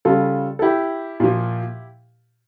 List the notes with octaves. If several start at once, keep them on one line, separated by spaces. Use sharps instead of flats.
C#3 G3 F4 A4
A4
E4 G4
A#2 F3